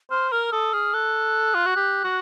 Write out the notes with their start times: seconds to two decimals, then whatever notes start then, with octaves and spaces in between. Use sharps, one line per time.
0.11 C5 F6
0.32 A#4 F6
0.52 A4 D#6
0.73 G#4 F6
0.93 A4 F#6
1.54 F4
1.66 F#4
1.76 G4
2.04 F#4